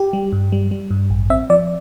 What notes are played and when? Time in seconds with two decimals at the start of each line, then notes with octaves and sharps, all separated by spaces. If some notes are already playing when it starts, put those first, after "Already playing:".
Already playing: G4
0.13 G3
0.32 G2
0.52 G3
0.71 G3
0.91 G2
1.10 A1
1.30 C4 E5
1.50 F3 D5